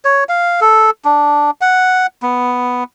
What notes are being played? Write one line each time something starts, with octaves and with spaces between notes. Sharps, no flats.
C#5
F5
A4
D4
F#5
B3